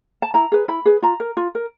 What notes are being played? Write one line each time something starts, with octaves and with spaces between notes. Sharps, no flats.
A5
E4 A#5
G#4 B4
E4 B5
G#4 B4
F4 A#5
A#4
F4
A#4